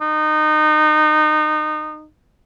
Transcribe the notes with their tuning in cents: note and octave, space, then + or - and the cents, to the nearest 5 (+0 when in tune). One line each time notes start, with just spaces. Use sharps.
D#4 -25